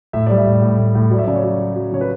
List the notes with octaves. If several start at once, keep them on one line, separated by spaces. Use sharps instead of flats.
A2 E5
G3 D5
E5
A2
A2
A2
A2
F#3 D5
E5
D5
C#3
C#5
F#3
F#3
F#3
C#3 C#5
B4